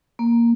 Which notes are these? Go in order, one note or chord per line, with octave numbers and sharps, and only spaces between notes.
A#3